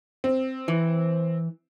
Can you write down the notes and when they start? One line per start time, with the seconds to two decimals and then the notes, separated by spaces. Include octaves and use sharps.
0.24 C4
0.68 E3